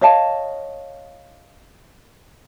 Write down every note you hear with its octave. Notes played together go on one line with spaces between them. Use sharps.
C#5 D#5 F5 A5